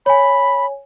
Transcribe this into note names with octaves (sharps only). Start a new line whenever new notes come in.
C#5 G#5 B5